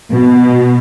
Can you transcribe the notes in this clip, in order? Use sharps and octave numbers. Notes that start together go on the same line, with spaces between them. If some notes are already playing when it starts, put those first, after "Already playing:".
B2